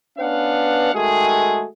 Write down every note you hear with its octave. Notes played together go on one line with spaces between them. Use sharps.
B3 C#4 D4 B4 F5 F#5
D#3 G#3 A3 F#4 G#4